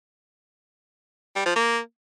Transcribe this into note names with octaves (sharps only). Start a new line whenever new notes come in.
G3
F3
A#3